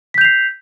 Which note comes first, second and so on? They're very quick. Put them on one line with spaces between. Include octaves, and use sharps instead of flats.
B6 G6 F7 C7